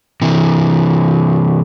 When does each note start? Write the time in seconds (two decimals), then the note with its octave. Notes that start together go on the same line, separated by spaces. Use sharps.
0.22 C3 E3